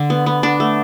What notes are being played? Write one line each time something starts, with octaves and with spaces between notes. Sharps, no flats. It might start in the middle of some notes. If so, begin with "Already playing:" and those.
Already playing: D3
B3
B3
D4
A3